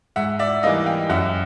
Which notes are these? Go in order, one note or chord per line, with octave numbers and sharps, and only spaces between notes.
G#2 E5 F#5
D5 E5
E3 G3 A#3 D#4 D#5 F5
F5 G5
F#2 E5 F#5